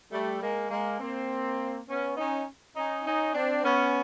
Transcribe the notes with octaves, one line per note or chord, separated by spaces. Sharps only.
G3 A3
G#3 A#3
G#3 A#3
A#3 C4
B3 C#4
C#4 D#4
C#4 D#4
C#4 D#4
C4 D4
B3 C#4